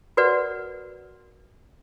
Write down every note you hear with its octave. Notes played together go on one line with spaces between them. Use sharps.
F#4 A#4 B4 D5 F#5